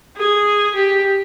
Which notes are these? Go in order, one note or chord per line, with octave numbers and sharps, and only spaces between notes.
G#4
G4